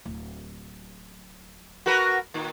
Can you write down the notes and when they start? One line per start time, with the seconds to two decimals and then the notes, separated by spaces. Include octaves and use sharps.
0.05 D1
1.86 F#4 A#4 B4
2.34 A#2 D#3